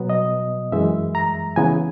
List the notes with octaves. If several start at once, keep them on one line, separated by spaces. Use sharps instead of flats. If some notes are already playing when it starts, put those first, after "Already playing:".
Already playing: B2 F#3 B3
D#5
F#2 E3 G#3 E5
A#5
C#3 E3 B3 G#5